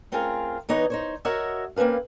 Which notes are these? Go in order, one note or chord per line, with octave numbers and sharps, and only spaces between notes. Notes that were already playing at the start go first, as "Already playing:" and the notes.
A3 C4 C#4 F4 G#4 A#4
E3 B3 D#4 C#5 D#5
D#4 C5 C#5
F#4 A#4 C#5 D#5 E5 F#5
A#3 C4 C#4 B4 F5